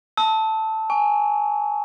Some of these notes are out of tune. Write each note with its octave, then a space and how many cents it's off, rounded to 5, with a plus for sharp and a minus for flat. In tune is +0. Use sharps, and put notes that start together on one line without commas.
A5 +0 E6 -40
G#5 +0 C#6 +25